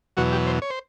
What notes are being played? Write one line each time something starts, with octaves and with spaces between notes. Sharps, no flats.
E2 B2 F#3 F#4
G4
C5
C#5
C5